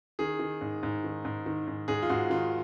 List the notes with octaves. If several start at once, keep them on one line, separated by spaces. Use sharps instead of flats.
D#3 G#4
D#3
G#2
G#2
D#3
G#2
D#3
G#2
G#2 G#4
F4
G#2 F#4
D#3 F4